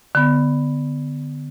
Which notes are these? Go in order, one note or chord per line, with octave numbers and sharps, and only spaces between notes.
D3 B3